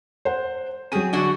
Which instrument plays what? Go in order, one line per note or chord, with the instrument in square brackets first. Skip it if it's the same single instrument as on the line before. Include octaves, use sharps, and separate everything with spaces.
[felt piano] C5 F#5
[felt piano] F#3 D#7 [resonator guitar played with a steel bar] C4 C#4 G#4
[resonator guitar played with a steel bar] D3 D4 F#4